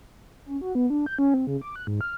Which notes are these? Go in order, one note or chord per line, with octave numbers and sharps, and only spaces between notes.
C#4
F#4
B3
D4
G6
C#4
C4
C#3
D6
F#6
G#2
F6